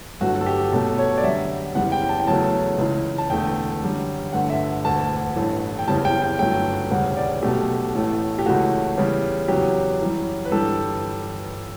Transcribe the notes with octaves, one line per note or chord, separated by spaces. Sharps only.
G1 G2 F#3 A3 F#4
A4
G4
B1 B2 F#3 A3 A4
C#5
D5
F#2 D3 G3 E5
F#1 E2 C#3 G3 F#5
G5
A5
G5
E2 C#3 F#3 A3 A5
C#2 C#3 E3
A5
E1 E2 D3 A3 G5
F#2 D3 G3
G1 G2 D3 A3 F#5
E5
E1 D2 D3 A5
A1 G2 E3 A3
G5
F#1 E2 C#3 G3 A5
G5
G5
G1 G2 F#3 A3 G5
E1 D2 C#3 G3 F#5
D5
B1 B2 A3 G4
A1 A2 E3 A3
G4
C#2 C#3 E3 A3 F#4
E2 C#3 E3 G3
E2 C#3 F#3 G4
F#2 E3 G3
B4
G1 G2 E3 G3 A4